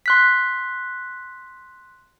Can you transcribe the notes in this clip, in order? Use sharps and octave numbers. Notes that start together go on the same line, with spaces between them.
C6 F#6 B6